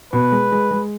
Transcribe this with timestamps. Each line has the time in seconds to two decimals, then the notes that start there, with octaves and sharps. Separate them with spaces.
0.13 B2 B4
0.32 G#3
0.52 G#3
0.71 G#3